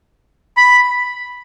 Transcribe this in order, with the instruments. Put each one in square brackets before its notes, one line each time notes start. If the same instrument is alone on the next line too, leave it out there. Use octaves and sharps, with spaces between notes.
[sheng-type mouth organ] B5